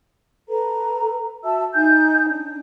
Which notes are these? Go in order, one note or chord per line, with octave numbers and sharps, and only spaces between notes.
A4 B4 A#5
F#4 E5 A5 E6
D#4 G#5 G6
C#4 D4